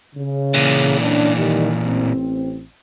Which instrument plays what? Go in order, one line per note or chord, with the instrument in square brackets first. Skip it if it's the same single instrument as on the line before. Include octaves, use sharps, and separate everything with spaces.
[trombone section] C#3
[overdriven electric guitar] A#2 E3
[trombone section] C#4 D4
D#3 G3
A1 C4